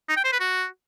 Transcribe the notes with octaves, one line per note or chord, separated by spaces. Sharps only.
D#4
G5
C5
B4
F#4